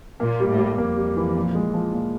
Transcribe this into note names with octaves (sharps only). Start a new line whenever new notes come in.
A#2 A#3
G3
A2
G3
F2 A#3
G3
E3
A#2
G#3
F3
A#2